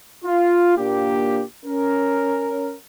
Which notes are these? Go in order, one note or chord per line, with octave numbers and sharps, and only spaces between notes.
F4
A#2 A#3 D4 G4
C#4 A#4